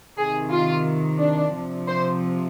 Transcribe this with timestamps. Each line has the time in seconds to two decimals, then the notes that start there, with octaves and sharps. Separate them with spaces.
0.17 C3 D#3 G#4
0.51 F4
1.18 D4
1.53 C3 F3
1.87 C5